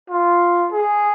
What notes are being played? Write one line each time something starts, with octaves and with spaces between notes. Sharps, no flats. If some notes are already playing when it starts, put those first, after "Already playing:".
F4
G#4